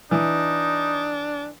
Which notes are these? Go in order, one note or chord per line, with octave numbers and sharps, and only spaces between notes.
E3 D4 D#4